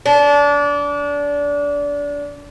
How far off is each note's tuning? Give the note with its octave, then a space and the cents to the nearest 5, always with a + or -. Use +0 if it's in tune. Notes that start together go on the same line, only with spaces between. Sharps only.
D4 -25